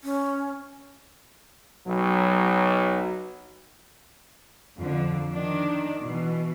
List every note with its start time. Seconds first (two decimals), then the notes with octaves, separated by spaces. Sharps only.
0.04 C#4
1.85 B1 F#3
4.77 F2 D3 F3
5.32 D#3 D4
6.02 B2 E3